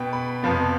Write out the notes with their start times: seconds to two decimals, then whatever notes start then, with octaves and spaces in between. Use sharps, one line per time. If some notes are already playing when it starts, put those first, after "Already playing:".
Already playing: B2 B3 G5
0.13 B5
0.43 F2 C3 F3 B3